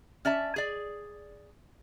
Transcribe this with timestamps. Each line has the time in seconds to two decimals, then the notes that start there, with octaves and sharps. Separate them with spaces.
0.25 C#4 D5 E5 A5
0.56 G#4 D5